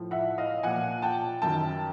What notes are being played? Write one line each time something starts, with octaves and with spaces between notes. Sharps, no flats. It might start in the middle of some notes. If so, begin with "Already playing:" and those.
Already playing: A2 F3
E5 F#5
D#5 F5
A#2 F3 F#5 G#5
G5 A5
F#2 D#3 G5 A5